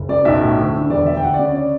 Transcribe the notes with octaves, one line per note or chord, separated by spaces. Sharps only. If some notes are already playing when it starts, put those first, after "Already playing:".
Already playing: F#1
F#2 D5
B1 E5
A2
D2
D3
E1 D5
D2 E5
G5
D2 F#5
D5
C#3
C#5
D5